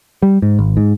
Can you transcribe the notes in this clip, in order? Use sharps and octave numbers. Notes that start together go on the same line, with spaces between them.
G3
G#2
G#1
G#2